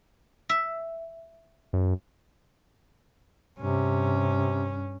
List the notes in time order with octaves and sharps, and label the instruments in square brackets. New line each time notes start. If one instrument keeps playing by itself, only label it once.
[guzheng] E5
[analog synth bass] F#2
[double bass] G2 C#4 [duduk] C3